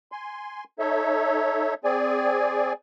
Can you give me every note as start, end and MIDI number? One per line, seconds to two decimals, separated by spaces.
0.12 0.64 80
0.12 0.64 84
0.79 1.74 63
0.79 1.74 69
0.79 1.74 73
0.79 1.74 76
1.84 2.73 60
1.84 2.73 68
1.84 2.73 74
1.84 2.73 80